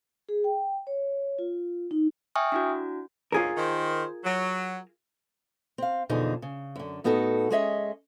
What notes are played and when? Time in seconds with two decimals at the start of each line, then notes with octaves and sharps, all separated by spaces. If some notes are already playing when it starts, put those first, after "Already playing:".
0.29 G#4
0.44 G5
0.87 C#5
1.39 F4
1.91 D#4
2.35 E5 G5 G#5 C#6 D#6 F6
2.52 D4 E4 F#4
3.32 D2 G#2 C#4 F4 G#4 A#4
3.57 D#3 C5
4.24 F#3
5.78 C4 F5
6.09 F2 B2 D3 E3 D#4 G#4
6.42 C#3
6.76 F#2 D3
7.04 A2 B3 D#4 F#4 A4
7.50 G#3 C#4 G#4 C#5 D#5 E5